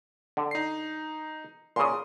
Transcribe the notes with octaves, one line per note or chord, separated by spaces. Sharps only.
D3
D#4 C7
A#2 C#3 C6 D#6